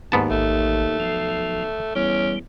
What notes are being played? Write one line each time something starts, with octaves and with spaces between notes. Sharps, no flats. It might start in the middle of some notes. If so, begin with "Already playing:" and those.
D#2 G#2 B3 A5
A1 A3
B1 F3
E2 G3 C#4